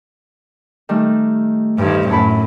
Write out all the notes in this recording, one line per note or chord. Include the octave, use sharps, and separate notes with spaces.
D#3 G3 A3
D2 G2 D#3
F#2 A2 C#5 A5 B5